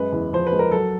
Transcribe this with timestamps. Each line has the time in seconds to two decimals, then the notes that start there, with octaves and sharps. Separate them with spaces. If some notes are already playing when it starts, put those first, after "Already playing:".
Already playing: F#2 G#3 B4
0.12 E2
0.33 F3 C5
0.47 B4
0.52 G#3
0.59 A#4
0.71 F#3 A4